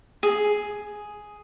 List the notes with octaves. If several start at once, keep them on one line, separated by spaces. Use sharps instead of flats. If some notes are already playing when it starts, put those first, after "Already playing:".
G#4